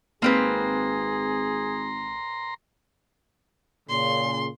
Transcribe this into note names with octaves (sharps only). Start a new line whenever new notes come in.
G#1 A#3 C4 G#4 B4 A#5 C6
A#2 C#3 C6